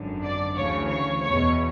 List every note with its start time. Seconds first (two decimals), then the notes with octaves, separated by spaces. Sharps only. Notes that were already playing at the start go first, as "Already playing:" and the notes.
Already playing: G#1 F#2 D3
0.23 D5
0.57 D2 C#3 E3 C#5
0.90 C#5
1.23 E2 B2 C#5